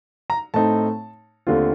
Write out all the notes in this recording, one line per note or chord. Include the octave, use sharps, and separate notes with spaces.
A#5
A2 A3 C4 D#4 A5
D#2 D3 A3 C4 F4